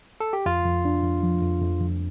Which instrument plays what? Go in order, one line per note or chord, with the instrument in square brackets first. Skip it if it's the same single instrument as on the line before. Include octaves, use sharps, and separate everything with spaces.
[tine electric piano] A4
G4
[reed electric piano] F2 [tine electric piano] F4
[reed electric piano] F2
D4
F2
F3
F2
F2
F2